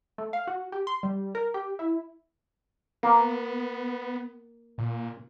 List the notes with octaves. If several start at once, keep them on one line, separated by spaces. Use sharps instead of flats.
A3
F5
F#4
G4
C6
G3
A#4
G4
E4
A#3 B3
A#2